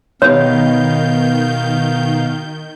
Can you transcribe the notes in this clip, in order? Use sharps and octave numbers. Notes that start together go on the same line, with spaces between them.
B2 D#3 B3 D#4 G4 C#5 F5 G6